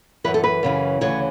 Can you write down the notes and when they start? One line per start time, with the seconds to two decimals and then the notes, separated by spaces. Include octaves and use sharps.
0.24 F#2 C#3 E3 B4
0.34 A4
0.44 B4
0.63 F#2 C#3 E3
1.01 D2 C#3 E3 C#5